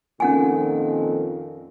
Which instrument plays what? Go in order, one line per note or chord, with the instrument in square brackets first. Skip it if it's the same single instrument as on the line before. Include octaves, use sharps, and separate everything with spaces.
[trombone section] F2 A#2 D#3 [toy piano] C#4 F#5 G#5